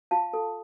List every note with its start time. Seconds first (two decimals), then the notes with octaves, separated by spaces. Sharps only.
0.11 F4 F5 A5
0.33 A4